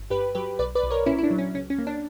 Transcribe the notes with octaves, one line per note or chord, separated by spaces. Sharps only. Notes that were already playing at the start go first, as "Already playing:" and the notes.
Already playing: G1
G2 G4 B4
F#3 G4 B4
B1 B4 D5
B4 D5
B1
A#4 C#5
A#2 C#4 E4
E4
D4
F#3
C#4
C#2 C#4
C#4
A#3
D4